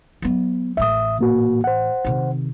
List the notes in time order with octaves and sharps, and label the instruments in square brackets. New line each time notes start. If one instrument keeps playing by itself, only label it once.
[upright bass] F#3 B3
[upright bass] A1 A3 [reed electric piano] E5 D#6
[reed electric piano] A#2 A#3 F#4
C5 F#5
[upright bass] C3 D#3